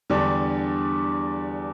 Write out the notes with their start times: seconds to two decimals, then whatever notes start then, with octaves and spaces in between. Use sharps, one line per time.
0.10 E2 D3 G3 D4